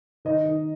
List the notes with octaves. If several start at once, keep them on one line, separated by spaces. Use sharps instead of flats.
D#3 D#5
D#3